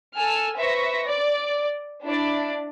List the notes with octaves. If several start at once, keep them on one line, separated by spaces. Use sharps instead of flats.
A4 G#5 E6 F6
B4 C5 E5 C#6 A#6
D5
D4 E4 D5